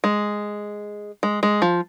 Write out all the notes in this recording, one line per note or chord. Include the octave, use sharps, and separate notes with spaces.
G#3
G#3
G#3
F3